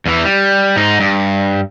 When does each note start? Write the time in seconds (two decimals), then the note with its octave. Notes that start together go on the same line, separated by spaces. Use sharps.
0.06 E2 E3
0.24 G3
0.76 G#2 D#4
1.00 G2